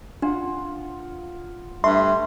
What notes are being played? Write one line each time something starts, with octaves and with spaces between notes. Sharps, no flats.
D4 F4 F#5
G2 A3 E5 C6